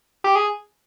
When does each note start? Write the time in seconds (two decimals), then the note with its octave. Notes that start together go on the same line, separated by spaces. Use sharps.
0.24 G4
0.36 G#4